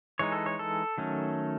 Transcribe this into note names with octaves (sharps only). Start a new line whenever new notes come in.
E3 G#3 D#4 C#5
A4
C#5
A4
D#3 F#3 A3 C#4